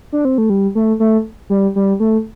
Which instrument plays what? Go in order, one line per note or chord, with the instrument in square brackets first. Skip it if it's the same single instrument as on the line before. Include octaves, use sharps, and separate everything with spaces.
[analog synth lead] D4
C4
A3
G3
A3
A3
G3
G3
A3